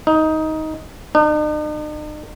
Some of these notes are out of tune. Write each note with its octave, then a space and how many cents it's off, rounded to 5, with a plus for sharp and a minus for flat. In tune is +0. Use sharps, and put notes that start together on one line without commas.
D#4 +15
D#4 -45